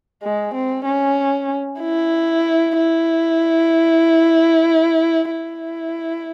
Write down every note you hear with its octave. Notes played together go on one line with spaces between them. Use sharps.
G#3
C4
C#4
E4
E4
E4